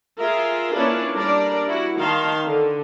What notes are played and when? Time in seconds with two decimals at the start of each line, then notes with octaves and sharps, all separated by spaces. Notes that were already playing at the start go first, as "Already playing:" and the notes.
0.19 F4 G#4 A#4 E5
0.76 A#3 C#4 D4 E4 F4 B4
1.15 G3 D4 A#4 D5
1.68 E4 F#4
1.98 D#3 D#4 F5 A5 C6
2.46 D3